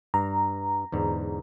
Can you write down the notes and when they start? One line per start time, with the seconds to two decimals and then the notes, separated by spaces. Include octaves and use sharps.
0.14 G2 A#5
0.92 E2 G#2 D3